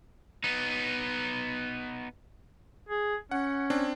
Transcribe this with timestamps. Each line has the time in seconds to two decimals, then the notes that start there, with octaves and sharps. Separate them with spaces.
0.44 B3 D#4
2.89 G#4
3.31 C#4 F#5
3.70 C4 D4